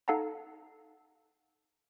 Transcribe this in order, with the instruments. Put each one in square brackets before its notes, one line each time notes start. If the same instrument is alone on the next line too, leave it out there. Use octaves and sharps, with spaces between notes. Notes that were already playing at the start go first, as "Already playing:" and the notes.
[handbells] D#4 A4 F5 F#5 A5 A#5